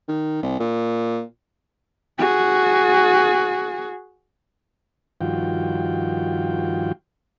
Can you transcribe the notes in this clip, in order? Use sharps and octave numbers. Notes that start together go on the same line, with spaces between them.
D#3
C2
A#2
F#4 G#4
G2 D#3 F3 F4 F#4 G5